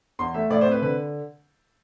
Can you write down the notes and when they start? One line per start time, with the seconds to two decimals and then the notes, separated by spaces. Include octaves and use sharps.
0.19 E2 C6
0.34 A3 E5
0.50 A2 D5
0.61 C5
0.66 C4
0.71 B4
0.82 D3 B4